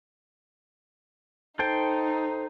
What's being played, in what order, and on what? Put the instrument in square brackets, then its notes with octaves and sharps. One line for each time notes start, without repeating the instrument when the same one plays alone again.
[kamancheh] D#4 [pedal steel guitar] A4 C5 G5